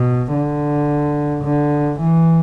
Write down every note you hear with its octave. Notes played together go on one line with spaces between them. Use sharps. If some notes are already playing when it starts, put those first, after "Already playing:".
Already playing: B2
D3
D3
E3